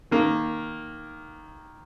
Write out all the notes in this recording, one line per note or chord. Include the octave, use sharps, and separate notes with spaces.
D#3 A#3